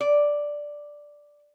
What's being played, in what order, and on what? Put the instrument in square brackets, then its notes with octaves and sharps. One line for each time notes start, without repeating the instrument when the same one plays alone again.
[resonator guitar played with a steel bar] D5